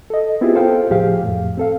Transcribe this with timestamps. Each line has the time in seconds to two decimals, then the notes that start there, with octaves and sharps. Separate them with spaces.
0.10 A4 D#5
0.41 B3 C4 E4 F4 G4 G#4
0.55 A4 C5 F5 G5
0.90 C#2 A2 F3 G4 G#4 F5
1.23 F2 A2
1.57 C4 A4 F5